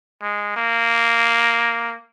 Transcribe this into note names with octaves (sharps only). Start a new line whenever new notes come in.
G#3
A#3